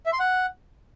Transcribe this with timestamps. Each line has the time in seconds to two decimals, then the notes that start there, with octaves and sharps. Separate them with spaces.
0.06 E5
0.13 C6
0.20 F#5